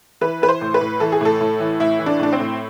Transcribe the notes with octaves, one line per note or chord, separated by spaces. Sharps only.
E3 B4
E3 B4
C5
A2
B4
A2
E3 A4
G#4
A2 A4
A2
E3
A2 E4
E3
D4
A2 D4
C4
A2